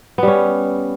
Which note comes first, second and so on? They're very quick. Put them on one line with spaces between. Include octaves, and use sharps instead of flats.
B3 G3 C#4